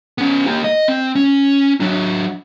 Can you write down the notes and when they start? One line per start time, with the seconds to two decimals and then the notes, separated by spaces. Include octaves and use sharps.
0.18 B3 C#4
0.46 A#3 G4
0.64 D#5
0.88 C4
1.15 C#4
1.80 F#3 D4